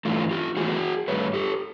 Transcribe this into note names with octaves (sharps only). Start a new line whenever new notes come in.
G2 E3 A3 F4
F4 G4
G2 E3 A3 F#4 G#4
G2 E3 A3 B4 C#5
G4 A4